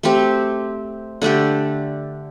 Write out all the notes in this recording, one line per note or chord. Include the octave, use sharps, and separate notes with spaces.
A3 C4 G4
D3 A3 D4 G4